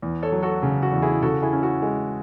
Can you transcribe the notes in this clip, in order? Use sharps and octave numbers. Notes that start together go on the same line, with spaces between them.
E2
A4 C#5
F#3
F#4 A4
C#3
F#4
E2
E4 G#4
C#3 F#4 A4
E4 G#4
C#4
F#4
G#3